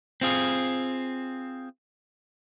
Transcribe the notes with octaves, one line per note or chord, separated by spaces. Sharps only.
C4 F4 G#4